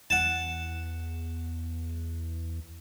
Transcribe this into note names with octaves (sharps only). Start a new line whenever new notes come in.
E2 F#5 A5